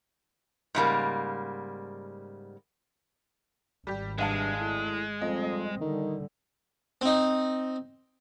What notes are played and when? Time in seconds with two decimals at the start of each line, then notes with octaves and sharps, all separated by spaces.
0.75 G#2 C#3 G3 A#3
3.87 G#1 G3 G4
4.18 C2 G2 G#3 F5 A5
4.60 A2
5.21 F2 G3 C4 D#5
5.81 D3 D#3 G3
7.01 C4 D#4